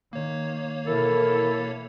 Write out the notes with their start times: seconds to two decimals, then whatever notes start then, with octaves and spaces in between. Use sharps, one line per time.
0.13 D#3 A#3 C#5
0.87 B2 E3 E4 A4 A#4